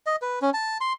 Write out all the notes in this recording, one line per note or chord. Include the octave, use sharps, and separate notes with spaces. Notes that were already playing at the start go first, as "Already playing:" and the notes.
D#5
B4
C#4
A5
C6